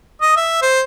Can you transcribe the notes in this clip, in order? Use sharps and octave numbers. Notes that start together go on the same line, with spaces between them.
D#5
E5
C5